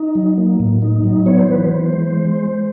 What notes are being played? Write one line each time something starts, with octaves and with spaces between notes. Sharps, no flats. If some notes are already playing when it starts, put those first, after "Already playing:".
Already playing: D#4
F#3
A#3
A2
D#4
F#3
B3 C#5
C5
E3 B4
C5
E3
G#3